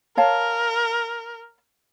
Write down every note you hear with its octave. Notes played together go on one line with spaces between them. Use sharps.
A#4 C#5 F5 A5